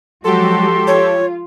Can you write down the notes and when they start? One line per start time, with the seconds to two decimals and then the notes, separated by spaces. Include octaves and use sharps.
0.24 F3 F#3 G#3 F#4 G4 A4 C6
0.87 F4 C#5